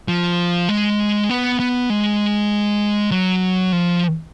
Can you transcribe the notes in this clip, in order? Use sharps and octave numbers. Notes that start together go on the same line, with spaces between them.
F3
G#3
B3
B3
G#3
F#3
F3